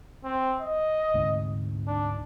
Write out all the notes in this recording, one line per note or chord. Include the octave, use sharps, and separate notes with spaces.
C4
D#5
D2 G#2 C3
D4